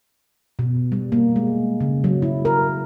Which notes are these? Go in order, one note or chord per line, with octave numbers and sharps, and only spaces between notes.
B2
G3
A#3
G#3
C#3
F#3
E4
A#4